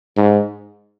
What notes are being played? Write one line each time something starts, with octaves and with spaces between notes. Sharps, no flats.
G#2